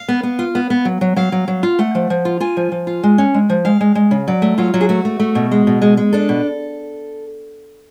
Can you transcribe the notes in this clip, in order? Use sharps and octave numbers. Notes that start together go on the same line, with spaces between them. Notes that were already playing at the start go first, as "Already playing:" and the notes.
Already playing: F5
B3
B3
F4
B3
B3
F#3
F#3
F#3 F5
F#3
F#3
F4
A3 F#5
F3
F3
F4
F4 G#5
F3
F3
F4
G#3
C#4
G#3
F3
G#3 F5
G#3
G#3
C#3
F#3 D5
A3
F#3 F4
F#3
G#4
A3 F#4
A3
A3
B2
G#3
B2
G#3
G#3
D4 A4
B2